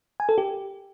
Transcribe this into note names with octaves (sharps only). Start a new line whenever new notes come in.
G#5
A4
G4